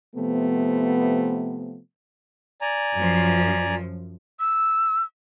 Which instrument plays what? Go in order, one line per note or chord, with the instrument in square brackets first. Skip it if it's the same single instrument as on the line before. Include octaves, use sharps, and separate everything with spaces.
[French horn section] C3 F3 A3 B3
[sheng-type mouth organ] D5 G#5 A#5
[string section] F#2 F3
[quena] E6